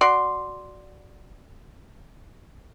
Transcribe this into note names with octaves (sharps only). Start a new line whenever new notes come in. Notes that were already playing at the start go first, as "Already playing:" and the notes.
F#4 D5 C6